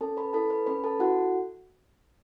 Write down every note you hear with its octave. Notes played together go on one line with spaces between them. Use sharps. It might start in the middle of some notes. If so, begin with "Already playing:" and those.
C#4 A4 A5
B4 B5
E4 A4 A5
B4 B5
C#4 B4 B5
A4 A5
E4 F#4 A4 F#5